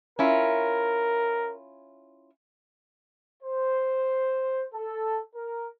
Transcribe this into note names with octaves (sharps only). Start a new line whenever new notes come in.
C#4 E4 F4 A#4
C5
A4
A#4